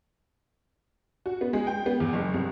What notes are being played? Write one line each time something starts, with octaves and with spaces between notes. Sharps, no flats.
F#4
B3
G#3
G5
B3
E2
F#1
C2